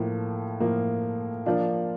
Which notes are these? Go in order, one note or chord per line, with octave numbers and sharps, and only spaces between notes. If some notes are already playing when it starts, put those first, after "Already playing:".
Already playing: A2 F3 A#3
A2 F3 A#3
F3 A#3 D4 F4